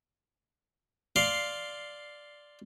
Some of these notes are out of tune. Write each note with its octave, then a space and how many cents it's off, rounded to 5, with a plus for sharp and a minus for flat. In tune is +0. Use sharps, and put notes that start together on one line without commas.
D5 +0 F5 +0 C6 +0